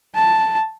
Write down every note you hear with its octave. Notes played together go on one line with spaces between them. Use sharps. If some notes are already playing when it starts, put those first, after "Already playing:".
A5